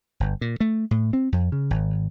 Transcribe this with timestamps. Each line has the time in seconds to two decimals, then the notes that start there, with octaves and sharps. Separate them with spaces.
0.20 G1
0.41 A#2
0.60 A3
0.91 A2
1.13 C4
1.32 F2
1.52 C#3
1.70 G#1